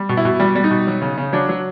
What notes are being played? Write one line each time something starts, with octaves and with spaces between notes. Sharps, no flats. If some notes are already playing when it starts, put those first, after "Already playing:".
Already playing: G3
B2
E4
B2
G3
G3
D#4
B2
F#3
C#3
C#3
F#3 D4
F#3